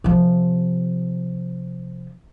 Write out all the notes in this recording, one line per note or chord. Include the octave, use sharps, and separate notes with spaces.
C3 F3